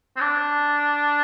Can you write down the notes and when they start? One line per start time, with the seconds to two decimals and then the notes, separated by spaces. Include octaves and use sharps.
0.17 C4
0.21 D4